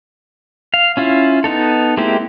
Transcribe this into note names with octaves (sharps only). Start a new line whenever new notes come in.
F5
C#4 E4 F4
B3 D#4 A4
G#3 A#3 C4 E4 G4